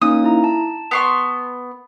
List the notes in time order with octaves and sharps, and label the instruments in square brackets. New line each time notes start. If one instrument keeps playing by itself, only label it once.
[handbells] A#3 C#4 D#4 [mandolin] D#6
[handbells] E4 A#5
A5
[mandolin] B3 C6 C#6